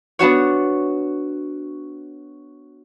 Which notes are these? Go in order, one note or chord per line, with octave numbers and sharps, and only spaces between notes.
B3 D4 F#4 C#5